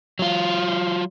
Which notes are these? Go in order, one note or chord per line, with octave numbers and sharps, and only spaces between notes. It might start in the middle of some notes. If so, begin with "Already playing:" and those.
F#3 F4